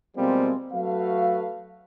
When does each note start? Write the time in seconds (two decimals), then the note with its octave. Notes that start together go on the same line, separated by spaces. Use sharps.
0.17 B2 F3 G3 G#3 A#3 C4
0.72 F#3 A3 F#4 A4 B4 F5